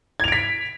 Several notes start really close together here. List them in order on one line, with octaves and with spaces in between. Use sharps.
G#6 F7 D7 B6